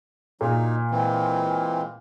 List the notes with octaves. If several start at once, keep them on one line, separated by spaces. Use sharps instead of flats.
A#2 F#3 D#4
E3 G#3 C4